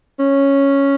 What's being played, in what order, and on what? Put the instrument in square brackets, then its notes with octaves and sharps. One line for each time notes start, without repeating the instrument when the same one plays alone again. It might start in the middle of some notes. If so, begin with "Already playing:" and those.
[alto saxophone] C#4